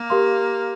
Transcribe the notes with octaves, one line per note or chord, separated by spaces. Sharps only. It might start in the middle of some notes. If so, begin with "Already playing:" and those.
Already playing: A#3
G4 A#4 F5 C6